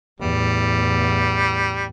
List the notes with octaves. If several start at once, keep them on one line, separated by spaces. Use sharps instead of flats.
E2 A2 G3